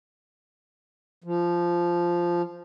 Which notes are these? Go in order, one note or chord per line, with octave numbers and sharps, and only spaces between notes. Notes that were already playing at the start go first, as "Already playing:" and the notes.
F3